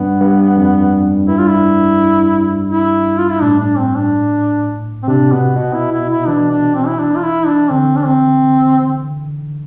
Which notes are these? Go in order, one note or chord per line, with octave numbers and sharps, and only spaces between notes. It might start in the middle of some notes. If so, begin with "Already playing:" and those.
Already playing: G2 B3
G2
F2
G2 E4
F4
E4
E4
F4
E4
A2 D4
D4
C4
D4
C4
C3 D4
B2 B3
B2 B3
E4
E4
E4
E3 D4
D4
C4
E4
D4
F4
E4
D4
D3 C4
D4
C4